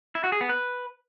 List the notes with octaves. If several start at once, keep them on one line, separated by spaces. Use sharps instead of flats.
E4
F#4
G#4
B3
B4